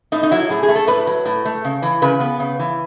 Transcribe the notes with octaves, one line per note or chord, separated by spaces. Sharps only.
A2 D#4
D#4
F#3 E4
A2 G#4
G#4
A3
A4
A2 B4
F#3
A2
A3
C#3
E3
C#3 B4
B3
C#3
E3